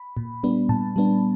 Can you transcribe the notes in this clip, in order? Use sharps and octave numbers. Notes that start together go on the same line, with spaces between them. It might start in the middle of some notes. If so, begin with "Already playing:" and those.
Already playing: B5
A#2
G3 B3 D4
A#2 A5
G3 B3 D4